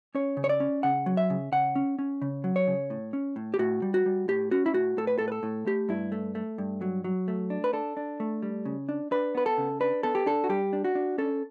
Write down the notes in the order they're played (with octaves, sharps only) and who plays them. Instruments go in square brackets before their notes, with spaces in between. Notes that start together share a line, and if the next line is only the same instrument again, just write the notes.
[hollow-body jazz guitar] C#4 C#5
C#3
C#5
D5
C#4
C#3 F#5
F#3
E5
C#3
C#3 F#5
C#4
C#4
C#3
F#3
C#5
C#3
A2
C#4
A2
G4
A2 F#4
G3
F#4
G3
A2 G4
C#4 F#4
E4
A2 F#4
A2 A4
B4
A2 A4
B4
A4
A2
A3 G4
G2 E4
A3
A3
G2
F#3
F#3
A3
D4
B4
D4 A4
D4
A3
G3
C#3
D4
D4 B4
B3 B4
A4
C#3
D4 B4
B3 A4
G4
D4 A4
F#4
G3 G4
D4
F#4
D4
C#4 A4